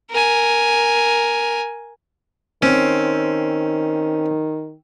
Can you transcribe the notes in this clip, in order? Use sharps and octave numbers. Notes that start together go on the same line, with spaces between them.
A#4 G#5
D#3 C4 C#4